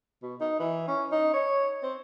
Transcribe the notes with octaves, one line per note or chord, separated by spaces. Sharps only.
B2
D#4
E3
C#4
D#4
C#5
C4